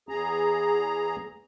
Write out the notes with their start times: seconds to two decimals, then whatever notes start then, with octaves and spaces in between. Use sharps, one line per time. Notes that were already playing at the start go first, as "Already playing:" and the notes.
0.09 E2 G#4 A#5